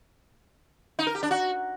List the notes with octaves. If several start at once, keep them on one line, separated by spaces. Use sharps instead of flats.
D#4
A#4
G4
D4
F#4